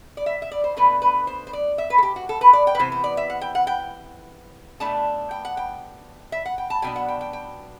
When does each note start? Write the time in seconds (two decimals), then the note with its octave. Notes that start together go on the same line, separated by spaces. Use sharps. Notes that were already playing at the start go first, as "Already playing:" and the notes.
0.17 D5
0.26 E5
0.42 E5
0.51 D5
0.64 C5
0.77 B2 A3 D4 B4
1.02 B4
1.27 C5
1.47 C5
1.53 D5
1.78 E5
1.90 B4
1.98 A4
2.03 G4
2.16 F#4
2.29 A4
2.41 B4
2.53 D5
2.67 G5
2.75 B4
2.79 C3 E3 B3 C5
2.92 C5
3.04 D5
3.17 E5
3.30 F#5
3.41 G5
3.55 F#5
3.67 G5
4.80 B2 A3 D4 A5
5.31 G5
5.45 F#5
5.57 G5
6.32 E5
6.45 F#5
6.58 G5
6.70 A5
6.82 B2 F#3 B3 D4 G5
6.96 F#5
7.08 G5
7.21 G5
7.33 G5